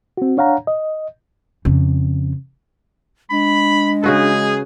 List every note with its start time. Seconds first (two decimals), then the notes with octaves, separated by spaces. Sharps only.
0.17 C4 F#4
0.37 D4 C#5 F5 F#5 A#5
0.67 D#5
1.65 F2 C#3
3.31 G#3 D4 B5
4.04 C#3 F#4 G#4 B4